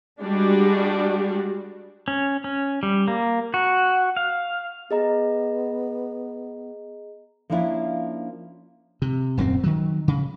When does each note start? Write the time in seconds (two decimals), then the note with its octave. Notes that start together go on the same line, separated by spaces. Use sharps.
0.21 G3 G#3 D4 F#4
2.08 C#4
2.44 C#4
2.83 G3
3.08 A#3
3.54 F#4
4.17 F5
4.91 B3 G#4 D#5 A#5
7.50 F3 A#3 C#4 D4 E4 F4
9.02 C3
9.37 D#1 F#2 F3 C4
9.64 D#3 F#3
10.08 C#3